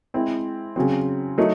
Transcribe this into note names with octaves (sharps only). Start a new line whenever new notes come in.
G#3 C4 E4
C#3 F#3 C4
F#3 A3 D#4